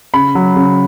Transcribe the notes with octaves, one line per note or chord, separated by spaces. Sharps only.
C#3 B5
F#3
C#3